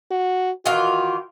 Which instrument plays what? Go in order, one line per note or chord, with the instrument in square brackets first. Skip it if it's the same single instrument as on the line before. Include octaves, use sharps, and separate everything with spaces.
[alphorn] F#4
[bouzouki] D#3 E3 F4 [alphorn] F#4